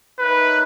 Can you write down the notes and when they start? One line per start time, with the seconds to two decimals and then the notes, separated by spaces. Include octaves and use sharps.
0.19 D#4 A#4 B4 C#5 E5